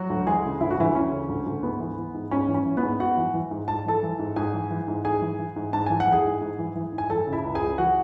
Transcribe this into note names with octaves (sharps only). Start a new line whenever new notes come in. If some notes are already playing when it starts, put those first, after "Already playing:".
Already playing: F#3 F#4
D2
E3 G#3 G#4
C#3
D2 E4
F#4
D2 E3 E4
E3 C#4
C#3
D2
D2
G#2 B3
E3
E3
G#2
G#2 C#4
E3
C#4
E3
B3 B4
G#2
G#2 F#4 F#5
E3
E3
G#2
G#2 A5
E3 A4 A5
E3
G#2
G#2 G#4 G#5
E3
E3
G#2
G#2 G#4 G#5
E3
E3
G#2
G#2 A5
E3 G#5
F#5
E3
G#4 G#5
G#2
G#2
E3
E3
G#2
G#5
E3 A4 A5
C#3
E4 E5
C#2
G#4 G#5
C#2
E3 F#4 F#5